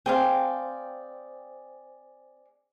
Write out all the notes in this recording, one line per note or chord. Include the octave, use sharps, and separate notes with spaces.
C4 G#4 D5 F5 G5 C6